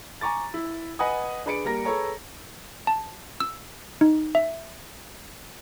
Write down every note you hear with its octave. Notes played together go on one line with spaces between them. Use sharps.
G#5 A#5 C#6 D6 A6
E4
B4 D#5 F#5 G#5 D#6
D4 G#4 B4 D5 C#7 D7
G3 A#3 A#4 A#6
G#4 A4 B4 C#5 A#5
A5
E6
D#4
E5